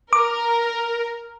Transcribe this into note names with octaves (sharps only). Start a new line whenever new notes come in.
A#4 D6